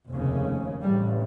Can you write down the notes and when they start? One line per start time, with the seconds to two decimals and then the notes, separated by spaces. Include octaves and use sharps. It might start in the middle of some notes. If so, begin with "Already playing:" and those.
0.10 F1 D#2 C#3
0.82 A1 G2 G3